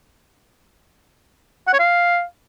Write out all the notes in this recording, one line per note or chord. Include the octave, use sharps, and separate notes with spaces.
F#5
C#5
F5